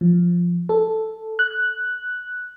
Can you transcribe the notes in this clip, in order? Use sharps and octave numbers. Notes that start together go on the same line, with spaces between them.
F3
A4
F#6